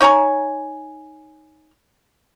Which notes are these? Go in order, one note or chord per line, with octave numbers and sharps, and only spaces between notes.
D#4 C#5 G#5 A#5